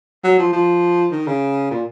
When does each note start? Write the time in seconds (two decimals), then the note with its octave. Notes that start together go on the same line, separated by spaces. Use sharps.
0.24 F#3
0.39 F3
0.53 F3
1.12 D#3
1.27 C#3
1.71 A#2